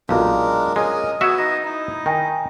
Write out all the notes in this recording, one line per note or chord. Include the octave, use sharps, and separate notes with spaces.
B1 A#2 G#3 D4 F4 A#4 F5
G#3 C#4 G#4 A#4 D#5
B3 F#4 E5 D#6 G#6 E7
D#4 A#6
D#4 E4
D#3 G5 G#5 A#6